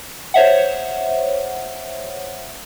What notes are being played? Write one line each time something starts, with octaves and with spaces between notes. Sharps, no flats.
C5 C#5 E5 F#5